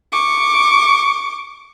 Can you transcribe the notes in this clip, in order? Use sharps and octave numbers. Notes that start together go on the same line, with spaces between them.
C#6 D6